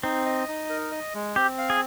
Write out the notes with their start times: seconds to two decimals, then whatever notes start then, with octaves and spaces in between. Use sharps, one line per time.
0.03 C4 D#4
0.26 D#5
0.48 D#4
0.69 A#4
0.92 D#5
1.14 G#3
1.36 C4 G4
1.58 F5
1.70 G#4